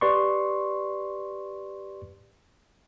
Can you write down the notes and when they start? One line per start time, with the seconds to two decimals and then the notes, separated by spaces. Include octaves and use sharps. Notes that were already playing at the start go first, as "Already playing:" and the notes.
0.01 G4 B4 D5 C6 C#6